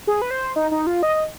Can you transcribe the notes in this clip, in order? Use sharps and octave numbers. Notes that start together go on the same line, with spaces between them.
G#4
B4
C5
D#4
D#4
F4
D#5